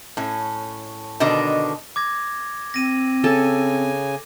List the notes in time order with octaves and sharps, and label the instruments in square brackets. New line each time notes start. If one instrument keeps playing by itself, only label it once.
[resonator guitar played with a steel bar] A2 C#4
B2 D3 D#3 D4 D#5
[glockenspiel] D6 G#6 A#6
[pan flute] C4 [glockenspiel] A#6 D#7
[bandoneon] C#3 G#5 [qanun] A4